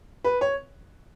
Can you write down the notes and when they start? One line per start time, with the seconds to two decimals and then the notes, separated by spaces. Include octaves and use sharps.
0.24 B4
0.41 C#5